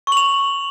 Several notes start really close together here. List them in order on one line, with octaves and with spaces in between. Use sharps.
C#6 F#7 F7